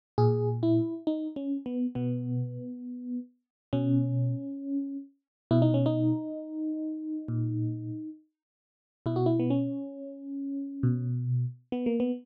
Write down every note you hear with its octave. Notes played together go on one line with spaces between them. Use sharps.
A#2 G#4
E4
D#4
C#4
B3
B2 B3
B2 C#4
B2 E4
D#4
C#4
D#4
A#2
B2 E4
F#4
E4
B3
C#4
B2
B3
A#3
B3